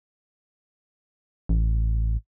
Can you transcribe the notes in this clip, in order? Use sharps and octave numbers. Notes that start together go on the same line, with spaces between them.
A1